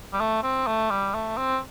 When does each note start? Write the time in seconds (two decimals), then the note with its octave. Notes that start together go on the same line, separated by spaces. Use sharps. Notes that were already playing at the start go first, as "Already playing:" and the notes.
0.14 G3
0.20 A3
0.43 C4
0.67 A3
0.91 G3
1.14 A3
1.38 C4